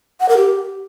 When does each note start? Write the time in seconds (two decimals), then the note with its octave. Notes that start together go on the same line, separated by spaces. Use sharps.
0.20 F#5
0.29 A#4
0.37 G4